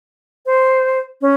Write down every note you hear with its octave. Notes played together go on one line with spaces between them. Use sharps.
C5
C#4